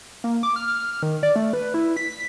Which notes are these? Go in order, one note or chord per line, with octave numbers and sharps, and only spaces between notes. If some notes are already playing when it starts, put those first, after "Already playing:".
A#3
D6
F6
F6
D#3
D5
A3
B4
E4
B6